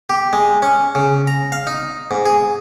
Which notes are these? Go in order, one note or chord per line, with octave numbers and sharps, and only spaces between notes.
G4
G#3
C#4
C#3
A#5
F5
D#4
G#2
G#4